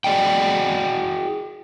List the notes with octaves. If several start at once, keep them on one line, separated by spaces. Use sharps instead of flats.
F#4 G#4 D5 D#5 G5